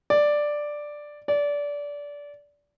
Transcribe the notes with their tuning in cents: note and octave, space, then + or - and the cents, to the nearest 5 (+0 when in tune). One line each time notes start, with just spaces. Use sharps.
D5 +5
D5 -20